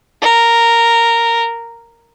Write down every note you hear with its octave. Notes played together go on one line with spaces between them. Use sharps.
A#4